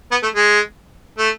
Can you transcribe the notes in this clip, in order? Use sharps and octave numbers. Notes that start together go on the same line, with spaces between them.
B3
A3
G#3
A3